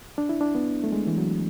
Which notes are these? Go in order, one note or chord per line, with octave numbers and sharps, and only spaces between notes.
D4
E4
D4
B3
A3
G#3
E3
F#3